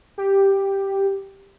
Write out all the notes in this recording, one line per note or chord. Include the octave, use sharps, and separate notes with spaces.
G4